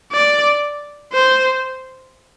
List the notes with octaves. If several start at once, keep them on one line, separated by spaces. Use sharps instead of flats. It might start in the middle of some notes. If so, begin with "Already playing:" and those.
D5
C5